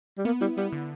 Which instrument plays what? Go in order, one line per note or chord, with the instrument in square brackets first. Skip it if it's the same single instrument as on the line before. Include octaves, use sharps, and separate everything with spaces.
[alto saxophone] G3
[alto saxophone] A#3 [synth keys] B3
[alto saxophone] G3 [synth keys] E4
[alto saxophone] G3 [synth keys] B3
[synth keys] D3